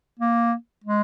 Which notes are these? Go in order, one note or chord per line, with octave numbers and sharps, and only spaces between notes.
A#3
G#3